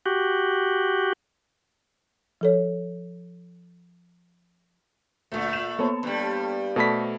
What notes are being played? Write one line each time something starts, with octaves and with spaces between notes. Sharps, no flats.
F#4 G4
F3 A4 C#5
D2 A#2 A3
E7 F7
A#3 B3 A4 C#5
G2 G3
B2 A3 A4 C5 D5 A5 B5 B6